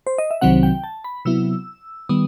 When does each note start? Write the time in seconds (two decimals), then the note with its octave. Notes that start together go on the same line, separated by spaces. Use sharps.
0.07 C5
0.18 D#5
0.31 E5
0.41 C2 C3 D#3 F#3 C4 F#5
0.63 G5
0.84 A5
1.04 B5
1.25 C3 F#3 B3 E4 E6
2.09 D#3 G3 B3 D#6